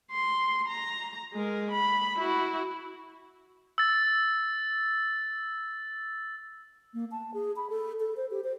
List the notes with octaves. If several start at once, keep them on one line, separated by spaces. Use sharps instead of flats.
C6
A#5
G#3 A#4
B5
E4 F#4
E6 A6
A#3
A5
G#4
B5
A4
A4
C5
G4
C5